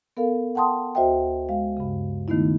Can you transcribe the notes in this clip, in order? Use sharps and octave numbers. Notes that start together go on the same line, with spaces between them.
B3 A4 A#4 F5
F#5 G5 A5 C6 D#6
D2 F#4 C5 D#5 E5 G5
G#3 F5
G2 C#3
D#3 A3 B3 D#4 E4